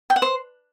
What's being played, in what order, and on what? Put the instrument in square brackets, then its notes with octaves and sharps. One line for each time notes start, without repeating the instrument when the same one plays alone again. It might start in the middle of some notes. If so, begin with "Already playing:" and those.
[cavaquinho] G5
F#5
C5